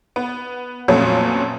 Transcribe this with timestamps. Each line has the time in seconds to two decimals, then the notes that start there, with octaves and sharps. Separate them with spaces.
0.16 B3
0.88 F2 A#2 F#3 A3 B3 C#4